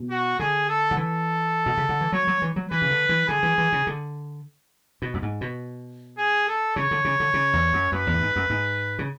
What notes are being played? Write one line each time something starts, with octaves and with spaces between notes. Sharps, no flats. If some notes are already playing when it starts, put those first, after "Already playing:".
Already playing: B2
F#4
D3 G#4
A4
D3
E3 A4
B2
C#3
D3
E3
F#3 C#5
F#3
E3
F#3
E3 B4
C#3
D3
E3
D3 G#4
E3
E3
C#3
D3
B2
F#2
G#2
B2
G#4
A4
C#3 C#5
D3
C#3
D3
C#3
E2
F#2
F#2 B4
E2
A2
G#2
F#2
G#2
C#3